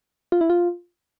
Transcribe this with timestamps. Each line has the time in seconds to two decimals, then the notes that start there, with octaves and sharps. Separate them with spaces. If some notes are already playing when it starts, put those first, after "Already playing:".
0.32 F4
0.41 E4
0.50 F4